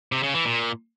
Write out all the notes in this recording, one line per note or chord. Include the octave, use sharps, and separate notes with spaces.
C3
C#3
E3
A#2